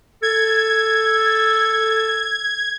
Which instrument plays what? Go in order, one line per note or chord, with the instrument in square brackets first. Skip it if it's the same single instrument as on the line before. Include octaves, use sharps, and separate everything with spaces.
[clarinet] A4 [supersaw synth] G#6